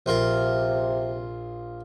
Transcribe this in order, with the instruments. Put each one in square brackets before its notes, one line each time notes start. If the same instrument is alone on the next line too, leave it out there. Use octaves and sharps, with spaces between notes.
[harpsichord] A#1 F4 A#4 [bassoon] C3